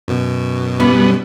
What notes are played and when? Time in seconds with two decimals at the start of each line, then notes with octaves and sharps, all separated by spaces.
0.08 F#2 B2
0.80 G3 B3 C#4 E4